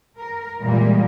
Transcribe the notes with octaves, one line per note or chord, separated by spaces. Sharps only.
A#4
A#2 E3 G3 G#3 A#3